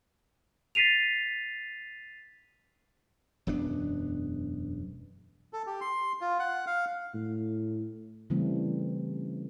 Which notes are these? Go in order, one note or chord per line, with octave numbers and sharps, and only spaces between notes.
A6 B6 C7 D#7 F7
E1 F#2 B3 D4
A4
G4
C6
F4
F#5
F5
A2
C#3 E3 G3 A3 C4